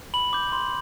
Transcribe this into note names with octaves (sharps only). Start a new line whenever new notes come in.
B5 F#7
D6 G6
C6